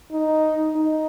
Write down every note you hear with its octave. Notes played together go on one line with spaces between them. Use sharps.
D#4
D#4